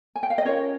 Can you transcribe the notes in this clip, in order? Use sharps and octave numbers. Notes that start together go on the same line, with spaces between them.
G#5
G5
F5
D#5
C#4 F4 A#4 C#5